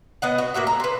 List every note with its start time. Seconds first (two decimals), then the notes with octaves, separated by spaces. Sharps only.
0.22 B3 D#5 F#5
0.38 F#4
0.54 A2 A#3 F#4 E5
0.67 A#5
0.80 B4 C5